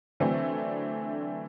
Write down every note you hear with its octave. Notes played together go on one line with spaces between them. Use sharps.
D3 E3 F#3 A3 C4 D4